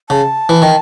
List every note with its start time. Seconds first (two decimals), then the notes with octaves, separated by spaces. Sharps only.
0.09 C#3 A5
0.49 E3
0.62 D#3